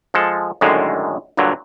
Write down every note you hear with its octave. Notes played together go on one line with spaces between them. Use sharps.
F3 G#3 A4
F#2 A2 D3 D#3 G#3
G2 A#2 D3 F#3